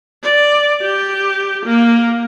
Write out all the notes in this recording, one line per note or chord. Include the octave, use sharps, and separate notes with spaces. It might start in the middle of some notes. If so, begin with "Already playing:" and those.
D5
G4
A#3